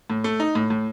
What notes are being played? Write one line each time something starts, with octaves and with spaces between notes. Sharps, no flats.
A2
A3
D#4
A2
A2